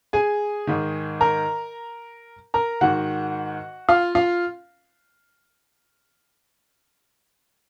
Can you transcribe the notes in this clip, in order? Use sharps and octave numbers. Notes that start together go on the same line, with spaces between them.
G#4 G#5
G#2 D#3
A#4 A#5
A#4 A#5
G#2 D#3 F#4 F#5
F4 F5
F4 F5